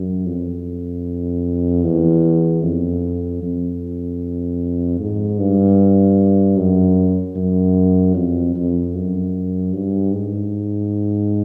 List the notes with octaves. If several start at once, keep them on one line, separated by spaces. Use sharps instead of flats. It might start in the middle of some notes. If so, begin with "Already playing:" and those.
Already playing: F#2
F2
E2
F2
F2
G#2
G2
F#2
F#2
F2
F2
F#2
G2
G#2